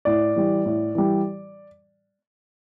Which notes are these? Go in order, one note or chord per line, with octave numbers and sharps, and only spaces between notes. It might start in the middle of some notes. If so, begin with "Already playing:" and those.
A2 D5
E3 G3
A2
E3 G3